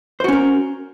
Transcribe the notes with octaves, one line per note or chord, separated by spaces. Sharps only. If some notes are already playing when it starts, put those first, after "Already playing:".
C#4 F#4 A#4 C5